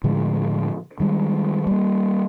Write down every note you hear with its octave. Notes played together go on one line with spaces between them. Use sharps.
A2 D3 F3 G#3
D#3 G3 G#3
G3 A#3